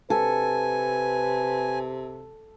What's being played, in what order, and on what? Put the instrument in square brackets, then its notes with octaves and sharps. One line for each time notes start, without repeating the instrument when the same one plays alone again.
[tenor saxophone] C3 [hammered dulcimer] A4 [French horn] B4 [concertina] G#5